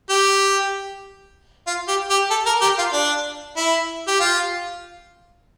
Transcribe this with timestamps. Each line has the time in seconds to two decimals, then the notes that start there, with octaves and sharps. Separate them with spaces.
0.10 G4
1.67 F4
1.88 G4
2.10 G4
2.31 A4
2.46 A#4
2.62 G4
2.78 F4
2.93 D4
3.57 E4
4.08 G4
4.20 F4